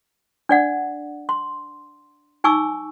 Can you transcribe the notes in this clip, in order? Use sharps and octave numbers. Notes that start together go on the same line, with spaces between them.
D4 D5 F#5
C6
D#4 G#5 C#6 D6 E6